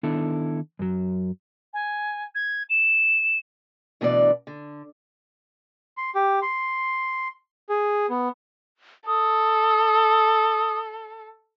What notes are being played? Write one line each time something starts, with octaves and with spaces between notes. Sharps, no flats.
D#3 B3 D4 E4 A4
F#2 F#3
G#5
G#6
E7
D2 B2 E3 D4 F#4 D5
D3
C6
G4
C6
G#4
B3
A4 D#6